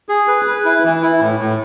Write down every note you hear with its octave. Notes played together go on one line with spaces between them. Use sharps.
G#4
B4
B4
E4
E3
E4
A2
A2